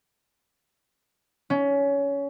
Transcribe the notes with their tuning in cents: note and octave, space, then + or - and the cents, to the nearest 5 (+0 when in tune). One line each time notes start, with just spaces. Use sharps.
C#4 +20